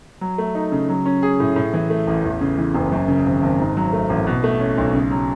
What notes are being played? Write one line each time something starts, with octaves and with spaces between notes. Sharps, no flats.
F#3
A3
D#4
C#3
F#3
C#4
G#4
A2
A2
E3
A3
A1
E2
C#3
E3
F#1
F#2
C#3
G#1
G#1
G#2
F#3
A3
A1
B2
A3
C#4
B1
C#3
F#3